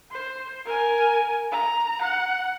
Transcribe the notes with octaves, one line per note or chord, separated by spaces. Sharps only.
C5
A#4 G#5
A#5
F#5